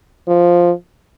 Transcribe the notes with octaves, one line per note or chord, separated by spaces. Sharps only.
F3